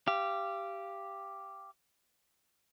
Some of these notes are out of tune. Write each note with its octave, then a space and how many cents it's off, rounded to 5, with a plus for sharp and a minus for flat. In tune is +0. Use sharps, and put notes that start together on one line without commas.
G4 +0 F5 -30